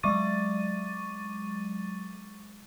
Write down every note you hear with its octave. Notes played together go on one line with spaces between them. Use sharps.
F#3 G#3 C#6 D6 A6 D#7